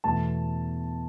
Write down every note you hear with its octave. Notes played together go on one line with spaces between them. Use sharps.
E2 B2 A3 A5